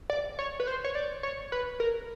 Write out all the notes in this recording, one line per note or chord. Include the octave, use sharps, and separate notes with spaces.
D5
C#5
B4
C5
C#5
D5
C#5
B4
A#4